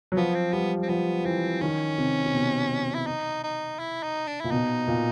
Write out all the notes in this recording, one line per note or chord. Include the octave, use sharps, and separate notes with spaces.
F#3
F3 B3
C4
G3 B3
C4
F3 B3
E3 C4
D#3 C#4
C3
C3
B2
E4
D#4
D#4
E4
D#4
D4
A#2 E4
B2 D#4
A#2